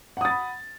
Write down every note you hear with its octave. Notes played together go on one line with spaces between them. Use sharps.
F#5 B5 D#6 A6